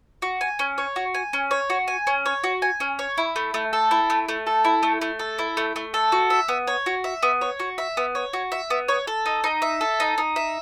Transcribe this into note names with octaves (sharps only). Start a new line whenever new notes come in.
F#4
G#5
C#4
C#5
F#4
G#5
C#4
C#5
F#4
G#5
C#4
C#5
F#4
G#5
C#4
C#5
E4
A3
A3
A4
E4
A3
A3
A4
E4
A3
A3
A4
E4
A3
A3
A4
F#4
E5
B3
C#5
F#4
E5
B3
C#5
F#4
E5
B3
C#5
F#4
E5
B3
C#5
A4
D#4
D#4
E5
A4
D#4
D#4
E5